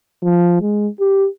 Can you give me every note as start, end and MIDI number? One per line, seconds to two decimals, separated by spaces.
0.23 0.58 53
0.61 0.88 56
1.00 1.27 67